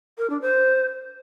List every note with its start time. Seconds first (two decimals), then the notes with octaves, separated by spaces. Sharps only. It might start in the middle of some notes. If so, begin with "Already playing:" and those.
0.18 A#4
0.30 D4
0.41 C5